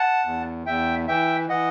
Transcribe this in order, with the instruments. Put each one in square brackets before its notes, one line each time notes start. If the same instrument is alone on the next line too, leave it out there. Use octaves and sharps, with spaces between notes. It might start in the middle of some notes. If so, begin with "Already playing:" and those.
Already playing: [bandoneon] F#5 A5
E2
E2 E5 G5
E3 E5 G5
E3 D#5 F#5